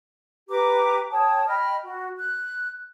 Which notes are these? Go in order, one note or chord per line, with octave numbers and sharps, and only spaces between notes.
G4 B4 A#5 D6
C#5 G5 A5 D#6
D#5 G5 B5 F6
F#4
F#6